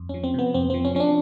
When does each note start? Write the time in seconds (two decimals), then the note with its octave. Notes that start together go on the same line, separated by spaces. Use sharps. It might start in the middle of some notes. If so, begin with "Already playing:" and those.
Already playing: F2
0.09 F3 C#4
0.24 C4
0.34 C3 B3
0.54 F2 C4
0.70 F3 C4
0.85 C#4
0.95 F3 C#4
1.00 D4